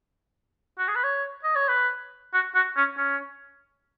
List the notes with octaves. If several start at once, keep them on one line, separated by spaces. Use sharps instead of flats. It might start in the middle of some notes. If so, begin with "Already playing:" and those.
F#4
G#4
B4
C#5
D#5
C#5
B4
F#4
F#4
C#4
C#4